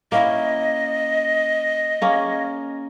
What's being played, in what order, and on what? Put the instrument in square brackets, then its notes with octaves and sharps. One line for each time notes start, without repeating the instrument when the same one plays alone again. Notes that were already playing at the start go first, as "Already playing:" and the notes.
[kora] A#3 C#4 E4 [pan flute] D#5
[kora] A#3 C#4 G#4